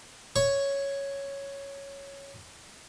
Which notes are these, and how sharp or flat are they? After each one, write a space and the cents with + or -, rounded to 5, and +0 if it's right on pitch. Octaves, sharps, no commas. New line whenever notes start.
C#5 +0 C#6 +0